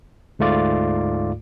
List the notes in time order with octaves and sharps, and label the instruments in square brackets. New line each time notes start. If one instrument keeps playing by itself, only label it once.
[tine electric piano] D2 G#2 A3 F4 D5